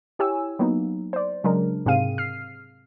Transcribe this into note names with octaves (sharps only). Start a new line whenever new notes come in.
E4 G4 C#5 G#5 E6
F#3 A#3 B3 D#4
C5 D5
C#3 F#3 G#3 D4 A#4
G#2 C3 C4 G#4 F5 D#7
F6 C7